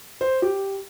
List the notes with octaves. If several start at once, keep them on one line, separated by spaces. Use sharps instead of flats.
C5
G4